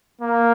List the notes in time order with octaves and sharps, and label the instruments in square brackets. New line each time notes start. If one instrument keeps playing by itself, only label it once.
[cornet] A#3